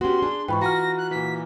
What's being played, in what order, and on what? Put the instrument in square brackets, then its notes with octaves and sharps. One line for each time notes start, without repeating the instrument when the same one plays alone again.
[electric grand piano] B3 C#4 [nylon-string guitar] F#4 G4 [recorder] C6
[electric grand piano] D4 [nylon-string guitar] G#4
[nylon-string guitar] G#2 [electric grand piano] E3 F4 B4 [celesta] G5 B5 C#6
[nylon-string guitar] F#4 F#5 G#5 [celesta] A#5 F6 [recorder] A#6
[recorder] F#6
[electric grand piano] A#2 E3 [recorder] B6